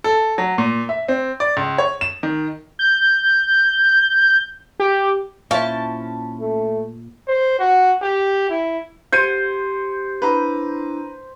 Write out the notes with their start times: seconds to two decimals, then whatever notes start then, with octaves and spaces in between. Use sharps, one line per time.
0.04 A4
0.38 F#3
0.58 A#2
0.89 E5
1.08 C4
1.40 D5
1.57 C#2
1.78 C#5
2.01 E7
2.23 D#3
2.79 G6
4.80 G4
5.51 A#2 C#4 E4 C5 F5 A5
6.40 A3
7.28 C5
7.59 F#4
8.02 G4
8.50 E4
9.12 G4 C5 G#6 C#7 D#7
10.22 D4 E4 B4 A#5 B5